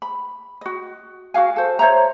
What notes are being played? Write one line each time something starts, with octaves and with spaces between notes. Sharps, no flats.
B5
F#4 D#5
F#4 G#4 F5 G#5
A4 C5
C5 C#5 E5 A#5